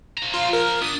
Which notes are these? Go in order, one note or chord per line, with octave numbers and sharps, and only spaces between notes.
F3 A#5
F4
A#4
B3 D4 D#6